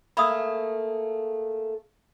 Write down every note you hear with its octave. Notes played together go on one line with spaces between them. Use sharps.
A3 A#3 G#4 B5 D#6 E6